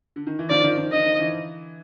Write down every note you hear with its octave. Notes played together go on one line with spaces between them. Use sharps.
D3
D#3
E3
D#3 F3 D5
D#3 F3
D#3
D3 D#5
D#3
D3 E3